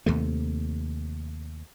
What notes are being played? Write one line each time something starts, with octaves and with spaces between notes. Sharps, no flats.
D#2 C3 A3